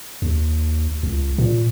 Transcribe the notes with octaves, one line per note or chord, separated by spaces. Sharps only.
D#2
C#2
A#2